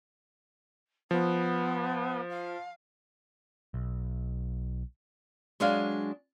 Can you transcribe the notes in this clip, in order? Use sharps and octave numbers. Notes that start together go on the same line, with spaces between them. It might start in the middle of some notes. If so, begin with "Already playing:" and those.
F3 B3
F5
B1
F#3 G#3 D4 G#4 F5